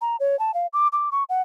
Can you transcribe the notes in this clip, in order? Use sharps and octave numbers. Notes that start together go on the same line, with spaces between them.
A#5
C#5
A5
F5
D6
D6
C#6
F#5